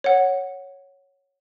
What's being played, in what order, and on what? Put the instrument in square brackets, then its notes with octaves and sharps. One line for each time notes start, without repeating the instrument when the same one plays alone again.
[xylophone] C#5 F#5